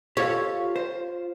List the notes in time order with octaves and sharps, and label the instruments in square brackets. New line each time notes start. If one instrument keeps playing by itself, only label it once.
[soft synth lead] F4 [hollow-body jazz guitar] G4 A4 F5 [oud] C#5
[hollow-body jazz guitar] C5